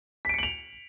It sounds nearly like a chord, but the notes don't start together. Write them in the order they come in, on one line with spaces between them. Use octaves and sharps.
B6 D7 C#7 F#7 F7